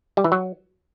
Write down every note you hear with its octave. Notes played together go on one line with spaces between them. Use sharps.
G3
E3
F#3